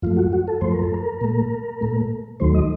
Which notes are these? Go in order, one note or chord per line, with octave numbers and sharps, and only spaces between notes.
F#2 F3 A3 F4
F#4
F#4
A4
F#2 F3 A3 C5
A#4
A4
A#4
A#2 A3
A#2 A3
D#2 D#3 F#3 A3 C5
D#5